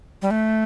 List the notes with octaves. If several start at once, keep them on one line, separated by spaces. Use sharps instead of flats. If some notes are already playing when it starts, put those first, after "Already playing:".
G3
A3